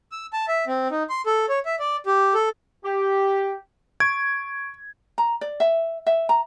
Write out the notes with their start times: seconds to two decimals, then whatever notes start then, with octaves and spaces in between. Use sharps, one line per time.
0.12 E6
0.33 A5
0.48 E5
0.67 C4
0.91 D#4
1.09 C6
1.26 A4
1.49 C#5
1.66 E5
1.79 D5
2.06 G4
2.34 A4
2.85 G4
4.00 C#6 G#6 D7
5.18 A#5
5.41 D5
5.60 E5
6.06 E5
6.29 A#5